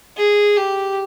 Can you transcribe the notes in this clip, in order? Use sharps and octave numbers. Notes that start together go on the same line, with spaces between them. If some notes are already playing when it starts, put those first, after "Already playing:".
G#4
G4